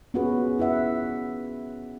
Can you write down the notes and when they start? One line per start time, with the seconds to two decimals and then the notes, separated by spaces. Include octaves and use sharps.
0.14 B3 C#4 F4 F#4 G#4 B4
0.59 E4 B4 E5 F#5